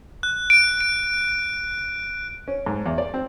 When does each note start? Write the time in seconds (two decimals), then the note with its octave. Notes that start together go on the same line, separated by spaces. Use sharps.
0.23 F#6
0.50 D7
0.81 D7
2.48 C#4
2.66 G#2
2.86 E2
2.98 D5
3.14 C4